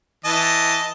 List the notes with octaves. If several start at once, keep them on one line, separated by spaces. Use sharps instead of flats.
E3 D#5 A5